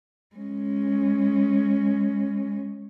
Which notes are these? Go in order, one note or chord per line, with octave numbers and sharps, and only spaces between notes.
G#3 C#4